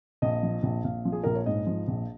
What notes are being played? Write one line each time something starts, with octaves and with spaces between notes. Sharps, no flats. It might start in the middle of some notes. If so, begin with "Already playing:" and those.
A#1 D#5
F3
A#1
A#1 F5
F3
G#4
A#1 A#4
C#5
G#2 D#5
F3
A#1